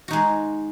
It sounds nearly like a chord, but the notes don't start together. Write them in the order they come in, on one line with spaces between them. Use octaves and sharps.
F#4 D#4 G#3 G#4